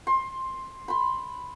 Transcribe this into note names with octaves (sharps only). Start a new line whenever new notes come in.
C6
B5 C6